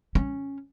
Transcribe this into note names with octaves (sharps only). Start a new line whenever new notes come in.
C#4